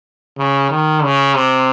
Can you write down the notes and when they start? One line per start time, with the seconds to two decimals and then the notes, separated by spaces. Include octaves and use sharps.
0.38 C#3
0.71 D#3
1.03 C#3
1.35 C3